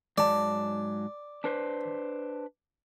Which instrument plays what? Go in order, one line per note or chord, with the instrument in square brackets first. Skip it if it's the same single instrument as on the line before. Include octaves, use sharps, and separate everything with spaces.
[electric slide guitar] G#2 F#3 A5 [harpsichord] D5
[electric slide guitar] D4 B4 C5